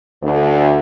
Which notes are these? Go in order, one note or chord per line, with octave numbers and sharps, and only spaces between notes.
D2